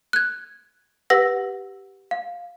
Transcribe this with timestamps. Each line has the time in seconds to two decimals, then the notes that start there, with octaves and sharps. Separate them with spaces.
0.13 F#6 G#6
1.10 G4 B4 F#5 E6 A#6
2.11 F5